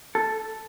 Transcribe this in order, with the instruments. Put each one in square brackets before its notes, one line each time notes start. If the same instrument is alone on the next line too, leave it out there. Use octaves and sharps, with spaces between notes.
[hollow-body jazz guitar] A4